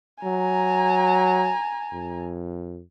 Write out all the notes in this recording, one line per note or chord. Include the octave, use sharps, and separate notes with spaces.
F#3 G#5 A#5
F2